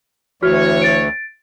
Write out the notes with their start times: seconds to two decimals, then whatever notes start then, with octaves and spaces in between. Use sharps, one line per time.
0.43 D2 E3 F#4 C#5 F6
0.82 A6 D7